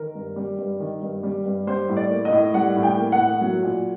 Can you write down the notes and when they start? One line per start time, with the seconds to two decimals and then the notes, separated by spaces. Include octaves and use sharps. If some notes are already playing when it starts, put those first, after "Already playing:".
Already playing: D#3 A#4
0.15 G2
0.36 G3
0.59 G2
0.80 D#3
1.02 G2
1.23 G3
1.46 G2
1.67 G3 C5
1.89 A2
1.97 D5
2.10 A#3
2.25 D#5
2.32 A2
2.54 G3 F#5
2.76 A2
2.83 G5
2.99 A#3
3.12 F#5
3.20 A2
3.41 F#3
3.63 A#2